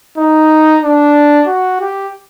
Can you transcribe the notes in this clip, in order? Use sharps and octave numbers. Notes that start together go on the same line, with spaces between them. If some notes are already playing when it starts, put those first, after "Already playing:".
D#4
D4
F#4
G4